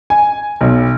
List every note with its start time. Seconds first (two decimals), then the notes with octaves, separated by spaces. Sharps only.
0.10 G#5
0.61 B1